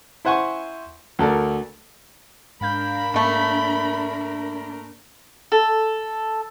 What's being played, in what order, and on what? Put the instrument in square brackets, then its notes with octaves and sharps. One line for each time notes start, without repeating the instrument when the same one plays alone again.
[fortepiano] E4 C5 F#5 G#5 C#6
D2 A4 A#4 D5
[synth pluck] G#2 F5 G6 [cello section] D4 A#4 [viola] B5
[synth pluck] G#2 A#3 [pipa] C#3 A3
[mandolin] A4